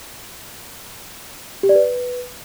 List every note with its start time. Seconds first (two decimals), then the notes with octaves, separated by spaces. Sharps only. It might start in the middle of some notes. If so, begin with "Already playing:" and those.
1.63 G4
1.69 D5
1.75 B4